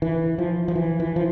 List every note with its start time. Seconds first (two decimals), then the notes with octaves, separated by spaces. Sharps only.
0.02 E3
0.38 F3
0.68 F3
0.75 E3
1.00 E3
1.16 F3